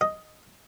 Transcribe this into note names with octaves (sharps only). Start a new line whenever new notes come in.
D#5